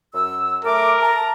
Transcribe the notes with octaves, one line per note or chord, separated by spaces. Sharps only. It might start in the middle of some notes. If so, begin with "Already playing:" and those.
F#2 E6
A3 A#4 D6
A5 A#5